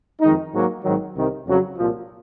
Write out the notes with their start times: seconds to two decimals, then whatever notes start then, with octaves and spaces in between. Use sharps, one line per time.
0.21 F2 D#3 G#3 D#4
0.52 G#2 F#3 A#3
0.84 G#1 G#2 D#3 F#3
1.15 C2 C3 D#3
1.46 F2 C#3 F#3
1.77 C2 A#2 F3